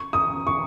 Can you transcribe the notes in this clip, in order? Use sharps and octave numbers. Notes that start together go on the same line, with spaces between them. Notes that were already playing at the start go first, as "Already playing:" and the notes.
Already playing: C#6
D#6
C#6